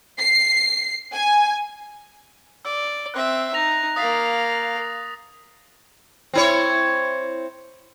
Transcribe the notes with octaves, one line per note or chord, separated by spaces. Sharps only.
C7
G#5
D5 E6
C4 E5 F#6
D#4 A#6 F7
A#3 F5 D#6 A6 B6
C4 E4 C#5